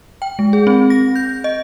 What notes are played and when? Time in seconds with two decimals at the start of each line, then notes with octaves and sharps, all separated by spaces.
0.22 G5
0.39 G#3
0.53 G#4
0.67 C4
0.90 A#6
1.15 G6
1.44 D#5